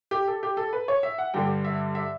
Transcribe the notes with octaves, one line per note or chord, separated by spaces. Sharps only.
G4
A4
G4
A4
B4
C#5
E5
F#5
G2 D3 G3 G5
E5
E5